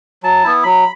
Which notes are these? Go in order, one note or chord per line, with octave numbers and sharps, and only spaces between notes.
F#3 A5
B3 E4
F#3 B5